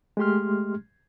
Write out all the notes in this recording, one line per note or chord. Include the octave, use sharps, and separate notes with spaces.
G#3 A3 G4 C6 F6